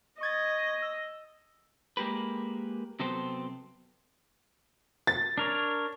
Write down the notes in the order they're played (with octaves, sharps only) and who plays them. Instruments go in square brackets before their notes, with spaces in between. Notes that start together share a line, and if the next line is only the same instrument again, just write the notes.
[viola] D#5 [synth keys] C#6 G#6 A6
[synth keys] E6
[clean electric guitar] G#3 A#3 G4 A#4 B4
C3 F#3 B3 C4 A4 C5
[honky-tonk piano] A6
[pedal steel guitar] D4 A#4 C#5